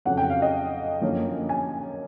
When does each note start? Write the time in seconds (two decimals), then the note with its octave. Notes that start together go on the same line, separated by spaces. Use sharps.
0.05 F2 C#3 F#3 F#5
0.17 G5
0.30 F5
0.42 D#5
1.02 F#2 D3 F3 A#3 C#4
1.49 G#5